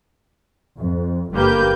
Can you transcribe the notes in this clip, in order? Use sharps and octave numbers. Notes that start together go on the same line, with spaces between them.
F2
G1 A#3 G4 B4 G6